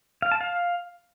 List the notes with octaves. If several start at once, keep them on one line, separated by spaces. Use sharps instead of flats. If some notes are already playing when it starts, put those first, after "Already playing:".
F5
A5
F5